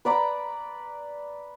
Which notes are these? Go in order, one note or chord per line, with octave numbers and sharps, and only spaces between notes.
B4 D5 A#5 B5